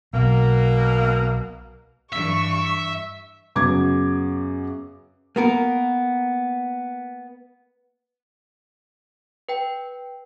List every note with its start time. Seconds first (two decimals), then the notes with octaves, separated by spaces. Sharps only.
0.13 B1 B2 A#3
2.13 G2 E3 E5 C#6
3.56 F#2 C#3 B3 D6 G#6
5.36 A#3 B3 A#4
9.49 B4 G5